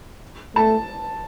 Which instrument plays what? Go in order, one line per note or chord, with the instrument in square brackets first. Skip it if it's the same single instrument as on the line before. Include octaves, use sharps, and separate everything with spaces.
[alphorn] A3 [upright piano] A5